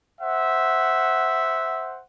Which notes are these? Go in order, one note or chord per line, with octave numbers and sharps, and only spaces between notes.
C5 E5 F#5